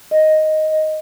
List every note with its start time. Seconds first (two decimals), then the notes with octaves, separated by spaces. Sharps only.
0.11 D#5